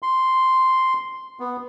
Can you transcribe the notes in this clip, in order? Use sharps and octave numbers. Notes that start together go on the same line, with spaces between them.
C6
B3